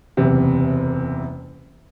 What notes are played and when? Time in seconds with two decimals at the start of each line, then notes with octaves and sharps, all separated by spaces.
0.17 F#1 E2 C3